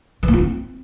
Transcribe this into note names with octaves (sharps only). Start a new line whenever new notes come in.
E3
A#3
F4
C4